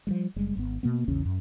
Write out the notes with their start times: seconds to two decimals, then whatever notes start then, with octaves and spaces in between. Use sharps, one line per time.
0.07 F3 G3 G#3
0.36 F#1 G3 G#3
0.57 G#1 B3
0.83 B2 A#3 B3
1.08 A#1 E2 C#3 C#4
1.25 F#2